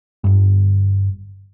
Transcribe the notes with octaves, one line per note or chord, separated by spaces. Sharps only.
G1 G2